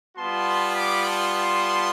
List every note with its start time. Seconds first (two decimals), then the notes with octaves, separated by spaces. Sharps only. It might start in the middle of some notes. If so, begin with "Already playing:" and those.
0.17 G3 B3 F4 A5 C6
0.75 B5 D6
1.05 A5 C6